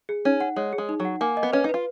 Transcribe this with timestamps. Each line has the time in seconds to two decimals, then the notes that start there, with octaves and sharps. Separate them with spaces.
0.09 G#4
0.25 C#4 D#4
0.40 F#5
0.56 G#3 C#5
0.73 G#4
0.78 G#3
0.89 D#4
1.00 F#3
1.05 F#5
1.21 A#3 G#5
1.37 D#5
1.43 B3
1.53 C#4 B4
1.64 D#4
1.69 F4 B4